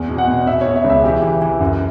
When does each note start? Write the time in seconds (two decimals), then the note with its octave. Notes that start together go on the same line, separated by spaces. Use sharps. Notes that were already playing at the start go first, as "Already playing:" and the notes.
Already playing: E2
0.09 B2
0.18 F#5
0.28 B2
0.47 B2 E5
0.61 C#5
0.66 B2
0.76 E5
0.84 C#2
0.90 E5
1.04 E3 G4
1.23 E3
1.42 E3
1.61 F#2